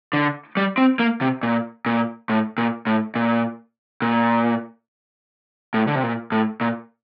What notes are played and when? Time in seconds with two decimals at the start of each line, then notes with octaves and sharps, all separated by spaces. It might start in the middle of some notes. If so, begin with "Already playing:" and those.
0.13 D3
0.57 G3
0.78 C4
0.99 A#3
1.21 C3
1.43 A#2
1.86 A#2
2.29 A2
2.58 A#2
2.87 A2
3.15 A#2
4.02 A#2
5.74 A2
5.87 D3
5.95 C3
6.03 A#2
6.32 A2
6.61 A#2